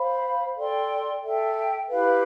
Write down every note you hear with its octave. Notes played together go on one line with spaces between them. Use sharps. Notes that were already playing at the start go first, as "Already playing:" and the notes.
Already playing: C5 F5 B5
A4 D5 G5 C6
A4 E5 G5
E4 G4 B4 F5